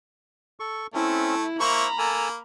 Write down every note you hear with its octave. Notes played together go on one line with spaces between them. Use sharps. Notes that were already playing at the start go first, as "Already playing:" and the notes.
A4 C#6
A3 C4 C#4 E4
A#3 E4 C5 A#5 B5 C#6
A#3 A4 G#5 A5